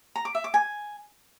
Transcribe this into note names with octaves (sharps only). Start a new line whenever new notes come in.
A#5
D6
E5
D6
G#5